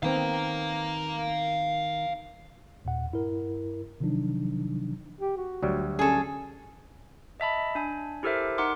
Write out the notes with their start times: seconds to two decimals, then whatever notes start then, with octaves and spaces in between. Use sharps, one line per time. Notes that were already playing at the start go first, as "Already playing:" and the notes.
0.03 D#3 B3 C4 F5 A#5
2.85 D#2 A#2 F#5
3.12 G2 E4 A#4
4.00 C3 D#3 F3 F#3 D4 D#4
5.20 G4
5.37 F#4
5.63 D2 F#3 G3
5.99 C#4 G#4 A4
7.40 D#5 E5 A5 B5
7.75 D4 G#5
8.23 E4 G4 A4 A#4 C5 E5
8.58 D#4 A#4 F#5 C6 D6